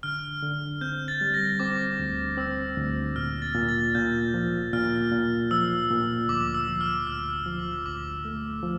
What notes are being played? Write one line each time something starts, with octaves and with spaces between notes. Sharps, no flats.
D3 F6
D3
C4 G6
A6
G3
A#6
C4 D6
D2
C4 E6
D2
A#2 F6
A6
A#2
A6
A#2 G6
F3
A#2 F6
A#2
F3 E6
A#2
D2 D6
E6
F3
F6
D2 F6
E6
F3
D6
D2 D6
A3
F3